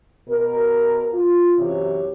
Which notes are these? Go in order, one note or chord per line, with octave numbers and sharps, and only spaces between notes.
B2 A#4
F4
F#2 C3 E3 G4 C#5